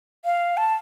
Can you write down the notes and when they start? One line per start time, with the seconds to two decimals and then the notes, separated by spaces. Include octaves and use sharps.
0.25 F5
0.57 A5